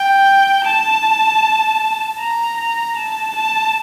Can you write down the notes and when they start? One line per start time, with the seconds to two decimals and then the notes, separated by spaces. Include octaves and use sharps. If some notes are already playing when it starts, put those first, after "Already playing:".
Already playing: G5
0.64 A5
2.19 A#5
2.57 A#5
2.96 A5
3.35 A5